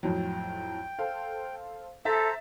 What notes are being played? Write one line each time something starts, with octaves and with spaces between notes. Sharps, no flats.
F2 A2 F#3 G5
A4 C5 F5
A4 C5 E5 A#5 A6 B6